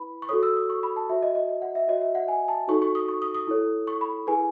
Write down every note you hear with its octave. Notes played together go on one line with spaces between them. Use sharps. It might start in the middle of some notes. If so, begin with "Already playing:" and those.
Already playing: E4 B4 B5
C#6
F#4 A4 C#5 D#6
E6
D#6
C#6
B5
A5
F#4 C#5 E5
D#5
D#5
D#5
F#5
E5
F#4 C#5 D#5
E5
F#5
G#5
A5
D#4 F#4 A4 C#5 C#6
C#6
D#6
C#6
D#6
D#6
E4 A4 C#5
C#6
B5
E4 G#4 B4 G#5